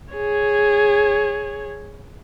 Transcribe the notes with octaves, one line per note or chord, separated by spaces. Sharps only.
G#4 C#5